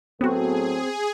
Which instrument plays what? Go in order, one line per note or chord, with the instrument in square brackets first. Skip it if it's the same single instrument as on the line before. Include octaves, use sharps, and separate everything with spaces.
[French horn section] A2 F#3 A4 [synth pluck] B3 F#4 [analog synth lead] C4 [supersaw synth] G#4